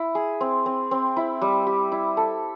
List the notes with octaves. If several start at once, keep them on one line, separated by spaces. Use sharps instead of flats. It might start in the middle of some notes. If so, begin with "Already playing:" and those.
Already playing: E4
G#4
C4
C4
C4
E4
G3
G4
E4
A4